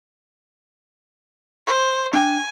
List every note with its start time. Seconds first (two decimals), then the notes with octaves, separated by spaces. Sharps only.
1.67 C5
2.13 D4 G5 G#5